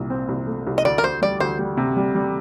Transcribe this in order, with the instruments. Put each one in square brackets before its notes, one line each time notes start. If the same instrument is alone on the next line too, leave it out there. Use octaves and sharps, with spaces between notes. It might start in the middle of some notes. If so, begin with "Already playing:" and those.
Already playing: [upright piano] C2 A#2
C4
C2
A3
C2
[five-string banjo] D#5
[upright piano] D2 [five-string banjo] D5
[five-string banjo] A#4
[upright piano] D2 [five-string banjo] C5
[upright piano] G3 [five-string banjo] D5
[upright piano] D2 [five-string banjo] C5
[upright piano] G3
C3
G3
G3